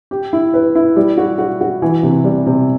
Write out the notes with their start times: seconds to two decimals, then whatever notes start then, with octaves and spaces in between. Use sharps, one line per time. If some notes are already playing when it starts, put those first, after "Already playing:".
0.11 G4
0.33 E4
0.54 B4
0.75 E4
0.96 G3
1.18 F#4
1.39 F#4
1.61 F#4
1.82 E3
2.03 C3
2.24 G3
2.47 C3